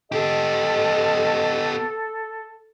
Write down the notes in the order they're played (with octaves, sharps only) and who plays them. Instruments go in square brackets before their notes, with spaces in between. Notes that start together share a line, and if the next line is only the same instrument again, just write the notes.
[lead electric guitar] B3 G4 [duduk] A4 [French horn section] D#5